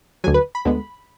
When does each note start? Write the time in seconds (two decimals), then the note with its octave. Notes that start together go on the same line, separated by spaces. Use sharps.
0.24 D2 D3 F#3 G#5
0.34 B4
0.55 B5
0.65 D2 D3 G#3 B3